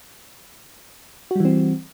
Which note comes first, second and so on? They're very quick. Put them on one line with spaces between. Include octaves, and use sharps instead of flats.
F#4 G3 E3 C4